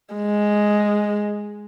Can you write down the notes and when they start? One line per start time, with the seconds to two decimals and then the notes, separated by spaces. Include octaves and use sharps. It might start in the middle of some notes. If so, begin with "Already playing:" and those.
0.14 G#3